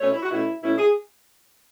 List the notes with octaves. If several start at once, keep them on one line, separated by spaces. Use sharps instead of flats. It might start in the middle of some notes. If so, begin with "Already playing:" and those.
B2 A3 C#4 C#5
E4
F#4
B2 A3 C#4 E4
B2 A3 C#4 E4
G#4